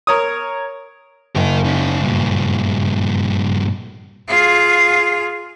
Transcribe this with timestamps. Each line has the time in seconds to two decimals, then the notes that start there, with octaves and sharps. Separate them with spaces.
0.07 A#4 C#5 D#6
1.35 F#1 A#4 D#5
1.64 C#4 D#4
2.02 G2 A#2
4.28 F4 G#4